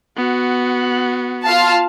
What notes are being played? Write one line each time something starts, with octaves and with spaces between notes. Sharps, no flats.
B3 F#4
F4 F5 A5